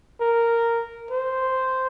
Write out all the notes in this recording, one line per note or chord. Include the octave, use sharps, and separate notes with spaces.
A#4
C5